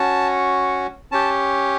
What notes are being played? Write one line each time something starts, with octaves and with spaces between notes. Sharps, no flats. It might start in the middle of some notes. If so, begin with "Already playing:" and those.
Already playing: C#4 F#4 A5
C#4 G4 A5